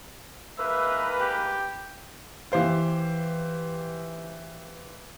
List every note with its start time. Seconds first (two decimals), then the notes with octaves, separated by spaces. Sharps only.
0.59 G#2 A#3 B4 E5
1.20 G4
2.52 E3 G4 C5 F5